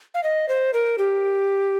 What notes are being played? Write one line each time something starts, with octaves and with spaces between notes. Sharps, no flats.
F5
D#5
C5
A#4
G4